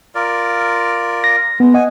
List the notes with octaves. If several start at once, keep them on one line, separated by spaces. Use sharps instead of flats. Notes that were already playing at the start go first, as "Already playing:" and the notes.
F4 A#4 D5
A#6
G#3 B3
D#5 F#5 G#5